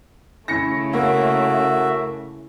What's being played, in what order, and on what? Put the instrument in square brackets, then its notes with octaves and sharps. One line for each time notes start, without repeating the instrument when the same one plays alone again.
[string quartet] C#3 A3 [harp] C#4 E4 [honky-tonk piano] A#6 C#7
[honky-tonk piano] A#3 [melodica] F#4 E5